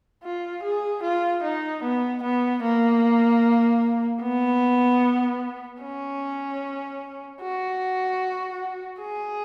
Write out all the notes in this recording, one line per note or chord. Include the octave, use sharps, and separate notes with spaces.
F4
G#4
F4
D#4
B3
B3
A#3
B3
C#4
F#4
G#4